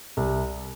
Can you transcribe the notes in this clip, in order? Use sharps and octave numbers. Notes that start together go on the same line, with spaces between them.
C2